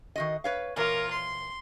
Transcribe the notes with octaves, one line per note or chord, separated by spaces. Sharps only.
D#3 F#4 D#5
B4 C#5 F5
A#2 E3 F4 A#4 C#5
C6